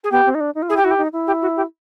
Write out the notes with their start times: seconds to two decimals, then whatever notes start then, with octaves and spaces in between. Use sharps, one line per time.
0.03 G#4
0.11 B3 G4
0.26 C4
0.35 D#4
0.40 D4
0.55 D#4
0.62 F4
0.69 E4 G#4
0.76 G4
0.84 E4 F#4
0.90 G4
0.98 D#4
1.13 E4
1.26 G4
1.41 F#4
1.56 G4